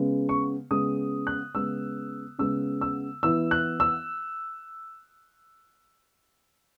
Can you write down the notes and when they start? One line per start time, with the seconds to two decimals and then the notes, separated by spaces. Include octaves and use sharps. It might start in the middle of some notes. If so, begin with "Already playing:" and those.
Already playing: C#3 G#3 B3
0.29 C#6
0.71 C#3 G#3 B3 D#6
1.27 F#6
1.55 C#3 G#3 B3 E6
2.39 C#3 G#3 B3 E6
2.81 E6
3.23 E3 B3 E4 E6
3.51 F#6
3.80 E6